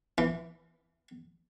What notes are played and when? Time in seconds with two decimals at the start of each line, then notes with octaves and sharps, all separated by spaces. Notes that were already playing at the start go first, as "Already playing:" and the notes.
0.18 E3